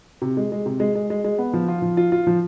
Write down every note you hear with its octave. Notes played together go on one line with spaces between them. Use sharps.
C3
G#3
G#3
C3
G#3
G#3
G#3
G#3
B3
F3
F4
F3
F4
F4
F3